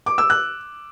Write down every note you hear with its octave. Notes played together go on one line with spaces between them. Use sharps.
D6
E6
F#6